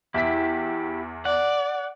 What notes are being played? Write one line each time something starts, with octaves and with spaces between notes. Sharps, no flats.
E2 E4 G4 E5 B6
D5 F#5